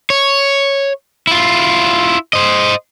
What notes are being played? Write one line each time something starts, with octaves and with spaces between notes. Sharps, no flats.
C#5
E4 F4
C5 D#5